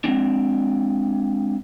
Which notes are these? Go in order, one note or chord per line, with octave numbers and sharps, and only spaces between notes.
G#3 A#3 C4 D4